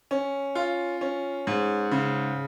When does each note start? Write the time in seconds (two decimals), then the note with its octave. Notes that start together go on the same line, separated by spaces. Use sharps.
0.11 C#4
0.55 F4
1.01 C#4
1.47 G#2
1.91 C#3